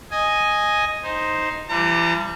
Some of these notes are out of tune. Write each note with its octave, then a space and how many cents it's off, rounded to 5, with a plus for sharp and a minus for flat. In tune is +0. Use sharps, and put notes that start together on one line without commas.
D#5 +0 G#5 +0
D#4 +0 C5 +0
E3 +40 G3 +0 A#5 -40